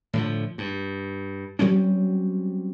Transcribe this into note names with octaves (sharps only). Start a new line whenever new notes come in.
A2 D3 F3
G2
F#3 G3 C4 C#4